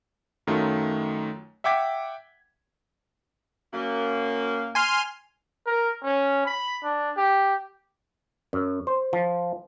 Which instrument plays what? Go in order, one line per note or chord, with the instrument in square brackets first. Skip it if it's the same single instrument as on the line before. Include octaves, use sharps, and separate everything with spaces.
[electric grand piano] F#2 D#3 F#3 A3 F4
E5 F#5 G5 D6 G#6 B6
[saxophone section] F#2 F#3 A#3
[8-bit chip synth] G#5 C6 F6
[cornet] A#4
C#4
B5
D4
G4
[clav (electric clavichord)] F#2
C5
F3